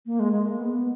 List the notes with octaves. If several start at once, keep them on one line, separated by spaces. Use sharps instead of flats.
A#3
G#3
G#3
A#3
B3